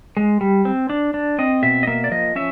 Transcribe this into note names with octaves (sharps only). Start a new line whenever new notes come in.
G#3
G3
C4
D4
D4
C4 D#5
B2 E5
D#5
A#3 E5
D5
F3 D#5
C#4 E5